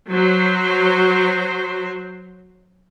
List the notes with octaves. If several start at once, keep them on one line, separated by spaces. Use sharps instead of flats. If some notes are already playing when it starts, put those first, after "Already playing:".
F#3 C5